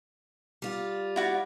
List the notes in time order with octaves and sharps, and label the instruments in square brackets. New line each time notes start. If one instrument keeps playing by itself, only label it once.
[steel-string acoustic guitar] G3 F4
[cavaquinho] E4 F#4 D5